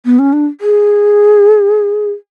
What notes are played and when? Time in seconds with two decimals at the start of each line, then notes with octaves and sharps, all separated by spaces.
0.05 B3
0.19 C#4
0.33 D4
0.61 G#4